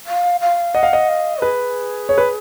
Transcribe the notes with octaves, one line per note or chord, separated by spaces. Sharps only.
F5
F5
D#5 F#5
F5
D#5
F5
G#4 B4
C#5
B4